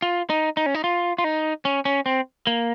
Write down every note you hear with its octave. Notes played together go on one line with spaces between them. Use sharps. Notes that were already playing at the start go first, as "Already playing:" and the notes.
F4
D#4
D#4
C#4
D#4
F4
F4
D#4
C#4
C#4
C4
A#3